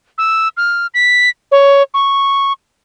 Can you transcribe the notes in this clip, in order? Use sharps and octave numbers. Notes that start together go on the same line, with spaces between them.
E6
F6
B6
C#5
C#6